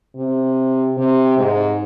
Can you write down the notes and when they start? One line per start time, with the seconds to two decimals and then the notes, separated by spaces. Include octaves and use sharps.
0.16 C3
0.97 C3
1.38 G#2